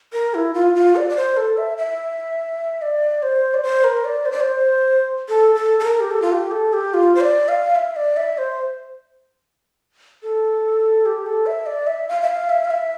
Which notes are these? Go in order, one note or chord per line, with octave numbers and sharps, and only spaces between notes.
A#4
E4
F4
F4
D5
D5
C5
A4
E5
E5
D5
C5
D5
C5
A#4
D5
C5
D5
C5
A4
A4
A4
A#4
G4
A4
F4
G4
A4
G4
F4
C5
D5
F5
E5
D5
E5
C5
A4
G4
A4
E5
D5
E5
F5
E5
F5
E5
F5
E5